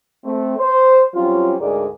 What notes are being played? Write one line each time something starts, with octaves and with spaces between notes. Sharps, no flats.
A3 C4
C5
F#3 G3 C4 C#4 F4
D2 G#2 G#3 G#4 A#4 D5